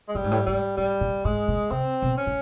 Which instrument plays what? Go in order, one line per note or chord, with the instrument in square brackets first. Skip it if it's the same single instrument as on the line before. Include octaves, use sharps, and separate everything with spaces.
[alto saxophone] G#3
[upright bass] A2 [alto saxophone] G3
[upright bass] G#2
A2
[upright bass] G#2 [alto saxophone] G3
[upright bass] A2 [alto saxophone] G3
[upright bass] A#2
[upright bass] A2 [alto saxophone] G#3
[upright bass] A#2
[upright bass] C3 [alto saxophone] C4
[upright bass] B2
[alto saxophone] C#4
[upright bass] A2